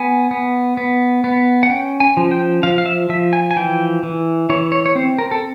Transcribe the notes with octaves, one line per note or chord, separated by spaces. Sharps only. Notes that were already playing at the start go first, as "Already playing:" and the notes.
Already playing: B3 G#5
B3
B3
B3
F#5
C#4 G5
G#5
F3
G5
F3 F5
F5
E5
F3 E5
G#5
G#5
E3 G5
E3
E3 C#5
C#5
C#5
C4 C5
A#4
A4